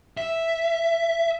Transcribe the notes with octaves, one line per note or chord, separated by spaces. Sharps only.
E5